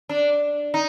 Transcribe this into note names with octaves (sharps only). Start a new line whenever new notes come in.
D4
D#4